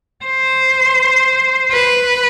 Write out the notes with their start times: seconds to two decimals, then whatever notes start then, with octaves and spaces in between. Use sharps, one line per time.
0.25 C5
1.72 B4